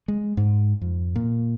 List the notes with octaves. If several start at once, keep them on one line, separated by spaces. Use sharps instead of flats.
G#3
G#2
F2
A#2